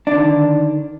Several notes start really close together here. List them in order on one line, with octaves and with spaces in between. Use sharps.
D4 D3 D#3